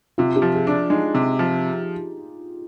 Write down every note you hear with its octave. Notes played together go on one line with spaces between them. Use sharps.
C3 F4
G4
F3
G#4
D4
G#3 D#4
C3
F3